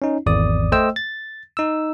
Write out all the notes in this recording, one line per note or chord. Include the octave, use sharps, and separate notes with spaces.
C#4 D#4
G#1 E2 D5 D#6
A3 C5 D#5 G5 E6
A6
D#4 E6